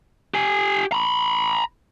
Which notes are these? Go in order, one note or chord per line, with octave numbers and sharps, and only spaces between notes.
G4 G#5
A#5 B5